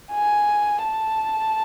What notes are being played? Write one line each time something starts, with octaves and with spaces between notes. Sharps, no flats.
G#5
A5